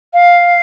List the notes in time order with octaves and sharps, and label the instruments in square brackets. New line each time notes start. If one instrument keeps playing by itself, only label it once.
[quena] F5